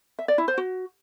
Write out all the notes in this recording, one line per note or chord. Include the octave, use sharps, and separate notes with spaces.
E5
D5
E4
C5
F#4